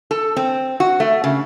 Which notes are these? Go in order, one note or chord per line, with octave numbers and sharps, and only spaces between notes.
A4
C4
F#4
A3
C#3